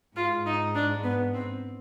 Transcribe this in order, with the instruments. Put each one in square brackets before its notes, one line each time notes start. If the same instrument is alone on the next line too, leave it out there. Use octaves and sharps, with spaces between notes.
[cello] G#2 [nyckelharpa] F4
[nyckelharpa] D#4
D4
B3
C4